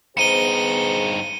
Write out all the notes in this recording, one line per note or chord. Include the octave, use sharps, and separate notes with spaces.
G2 B3 D#4 G#4 C5 C#7 D#7 G7